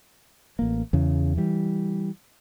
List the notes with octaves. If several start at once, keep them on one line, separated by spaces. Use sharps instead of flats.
A1 A#3
E2 C#3
E3 G3